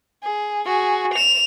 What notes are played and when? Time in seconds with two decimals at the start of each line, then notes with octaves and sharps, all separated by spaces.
0.23 G#4
0.66 F#4 G#4
1.14 E7 F7